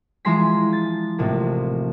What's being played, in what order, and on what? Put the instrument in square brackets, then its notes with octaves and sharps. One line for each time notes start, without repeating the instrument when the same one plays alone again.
[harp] E3 F3 G#3 A#5 C6 B6
A6
A1 C3 F3 A#3